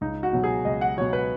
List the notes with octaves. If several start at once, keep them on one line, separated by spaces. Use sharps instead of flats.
C#2 D#4
F#4
B2 F#3
G#4
C#2 D#5
F#5
B2 F#3 C#5
B4